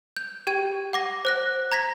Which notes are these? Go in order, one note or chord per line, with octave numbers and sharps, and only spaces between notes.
G6
G4 G5 G#6 D#7
F#5 D6 A#6
C5 F#6 A#6
A#5 G#6 A#6 B6